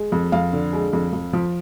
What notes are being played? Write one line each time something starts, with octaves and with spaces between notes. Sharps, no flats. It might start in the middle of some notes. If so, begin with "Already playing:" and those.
Already playing: G#3
F2
F2 F5
D3
G#3
F2
F2
F3